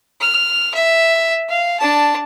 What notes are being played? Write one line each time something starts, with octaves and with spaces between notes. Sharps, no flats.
F6
E5
F5
D4 A5